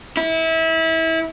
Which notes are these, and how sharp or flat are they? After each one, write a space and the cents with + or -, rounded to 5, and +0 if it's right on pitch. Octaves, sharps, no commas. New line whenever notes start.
E4 -25